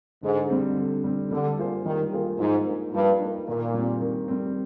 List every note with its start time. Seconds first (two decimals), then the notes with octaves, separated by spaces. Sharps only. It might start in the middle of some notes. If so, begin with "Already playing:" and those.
0.23 G#2 D3
0.50 G3 C4
0.77 D3
1.04 G3 C4
1.31 D3 G3
1.58 A#3 F4 G#4 C5
1.85 D#3 G3
2.12 A#3 F4 G#4 C5
2.39 G#2 F3
2.66 A#3 D#4
2.93 G2 F3
3.20 A#3 D#4
3.47 A#2 D#3
3.74 G3 C4
4.01 D#3
4.28 G3 C4